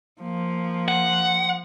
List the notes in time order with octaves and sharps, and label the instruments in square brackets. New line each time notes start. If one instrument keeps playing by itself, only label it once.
[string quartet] F3 [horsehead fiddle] A#3
[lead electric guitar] F#5